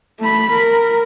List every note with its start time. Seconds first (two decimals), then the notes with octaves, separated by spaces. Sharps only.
0.20 A3 B5
0.53 A#4